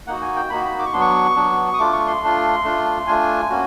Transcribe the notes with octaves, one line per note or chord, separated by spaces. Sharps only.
A#3 D#4 F#4 F#5
G#5
G5
A#3 D#4 F#4 B5
B5
D6
C#6
F#3 B3 D4 C6
C#6
F#3 B3 D4
D#6
A3 D4 F4 D6
C#6
C6
A3 D4 F4
A3 D4 F4
A3 D4 F4 G#5
A#3 C#4 F#4